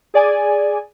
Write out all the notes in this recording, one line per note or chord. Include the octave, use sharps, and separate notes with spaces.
G#4 D5 G#5